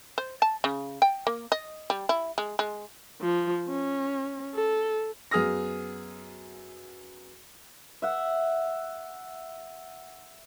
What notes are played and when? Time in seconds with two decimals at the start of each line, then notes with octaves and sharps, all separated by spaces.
0.18 C5
0.42 A5
0.64 C#3
1.02 G5
1.27 A#3
1.52 D#5
1.90 G3
2.09 E4
2.38 G#3
2.59 G#3
3.22 F3
3.69 C#4
4.55 A4
5.31 F#2 B3 G#4 D#6 F6 A#6
8.02 E5 F#5